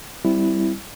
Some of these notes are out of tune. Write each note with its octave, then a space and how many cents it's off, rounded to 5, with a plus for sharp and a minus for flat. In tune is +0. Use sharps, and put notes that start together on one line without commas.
G3 +0 C4 +0 E4 +0